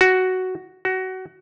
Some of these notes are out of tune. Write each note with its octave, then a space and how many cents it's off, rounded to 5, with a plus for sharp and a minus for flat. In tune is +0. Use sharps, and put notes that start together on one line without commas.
F#4 +5
F#4 +20